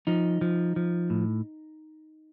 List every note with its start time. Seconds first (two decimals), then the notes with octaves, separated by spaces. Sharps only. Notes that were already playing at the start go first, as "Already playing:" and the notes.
0.07 F3 D#4
0.41 F3
0.76 F3
1.10 A2